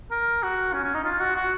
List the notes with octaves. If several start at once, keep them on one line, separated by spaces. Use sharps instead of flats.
A#4
F#4
C#4
C#4
D#4
F4
F#4
F#4